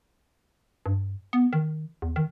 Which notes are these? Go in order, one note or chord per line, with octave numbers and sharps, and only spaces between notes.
G2
B3
D#3
E2
D#3